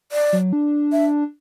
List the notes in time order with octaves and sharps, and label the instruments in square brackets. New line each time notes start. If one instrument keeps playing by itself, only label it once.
[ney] D5
[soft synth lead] F#3
D4
[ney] E5